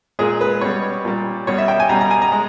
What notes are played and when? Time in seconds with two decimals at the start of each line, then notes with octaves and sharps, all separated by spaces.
0.19 A#2 G#3 G#4
0.41 B4
0.61 B2 G3 C#5
1.05 A#2 G3
1.47 B2 G3 C#5
1.58 E5
1.68 G5
1.80 G#5
1.89 B2 G3 A#5
2.01 A#5
2.11 G#5
2.22 A#5
2.32 G#3